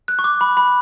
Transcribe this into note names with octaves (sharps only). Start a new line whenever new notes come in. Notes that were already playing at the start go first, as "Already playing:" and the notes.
F#6
C#6
D6
B5
B5